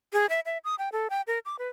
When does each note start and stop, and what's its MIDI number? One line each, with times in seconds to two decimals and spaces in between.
0.13 0.26 68
0.30 0.40 76
0.46 0.58 76
0.64 0.75 87
0.79 0.89 79
0.92 1.08 69
1.10 1.22 79
1.27 1.39 70
1.45 1.56 86
1.59 1.69 71